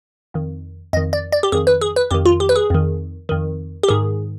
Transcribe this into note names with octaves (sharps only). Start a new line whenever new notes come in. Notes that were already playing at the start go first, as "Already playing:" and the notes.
F2 D#3
F2 D#3 D#5
D5
D5
G4
F2 D#3 G#4
B4
G#4
B4
F2 D#3 G4
F4
G4
B4
G#4
F2 D#3
F2 D#3
G4
G#2 D#3 G#4